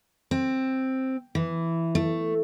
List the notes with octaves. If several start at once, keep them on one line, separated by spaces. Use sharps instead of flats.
C4
E3
A3